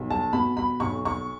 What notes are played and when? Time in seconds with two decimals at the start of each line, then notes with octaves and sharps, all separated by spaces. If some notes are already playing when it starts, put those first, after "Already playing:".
Already playing: B1
0.10 A5
0.33 B2 B5
0.57 B5
0.80 B1 C#6
1.05 C#6